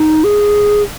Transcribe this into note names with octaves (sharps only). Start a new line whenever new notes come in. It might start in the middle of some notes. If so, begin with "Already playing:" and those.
Already playing: D#4
G#4